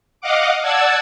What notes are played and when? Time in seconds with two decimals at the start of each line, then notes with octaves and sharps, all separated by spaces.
0.21 D#5 F5 F#5 D6
0.62 D5 F#5 A5 E6 G#6